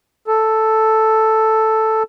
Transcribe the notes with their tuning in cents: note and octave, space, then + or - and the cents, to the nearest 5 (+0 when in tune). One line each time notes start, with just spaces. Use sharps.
A4 +0